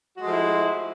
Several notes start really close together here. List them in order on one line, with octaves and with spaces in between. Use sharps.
F#4 G#3 A3 F3 E4